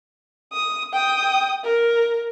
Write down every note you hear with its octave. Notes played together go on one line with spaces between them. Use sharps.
D#6
G5 D#6
A#4